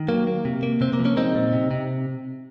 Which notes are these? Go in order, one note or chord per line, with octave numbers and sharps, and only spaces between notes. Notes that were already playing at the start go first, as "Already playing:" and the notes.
Already playing: D#3
F#3 A#3
A#3
C3
A#3
C3 C4
A#3
F3
A#3 C#4
G#3 C4 D#4
A#2
C3
C3